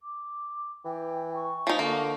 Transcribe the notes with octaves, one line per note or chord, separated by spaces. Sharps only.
D6
E3 G5
C#6
F3 D#4
D3 A#3